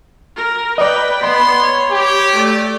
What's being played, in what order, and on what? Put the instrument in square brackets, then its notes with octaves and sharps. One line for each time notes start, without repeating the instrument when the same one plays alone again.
[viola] A#4
[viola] B4 G5 [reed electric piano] D5 D#5
[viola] B3 [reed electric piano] B5 [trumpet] C6
[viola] C#5
[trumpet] G4
[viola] A3 D5